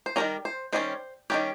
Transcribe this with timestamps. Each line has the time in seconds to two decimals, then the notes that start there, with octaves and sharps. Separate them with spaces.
0.06 C5
0.16 D#3 G3 C#4 A#4
0.45 C5
0.73 D#3 G3 C#4 C5
1.30 D#3 G3 C#4 G4